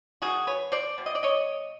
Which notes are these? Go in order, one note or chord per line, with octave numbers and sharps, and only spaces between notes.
D#3 G3 A#3 F#4 G#4
B4 C#5
C5 D5
B2 G3
D#5
D5
C#5 D#5